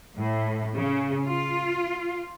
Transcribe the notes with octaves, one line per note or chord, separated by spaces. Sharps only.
A2
C#3
F4